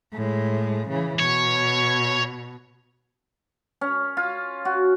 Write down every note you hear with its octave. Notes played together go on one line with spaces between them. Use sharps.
A2 G#3
C#3 E3
B2 C#5
C#4
F4
F#4